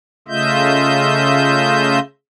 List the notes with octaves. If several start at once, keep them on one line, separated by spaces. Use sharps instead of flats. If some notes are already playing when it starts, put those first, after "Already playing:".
C#3 A3 F4 D#5 E5 G6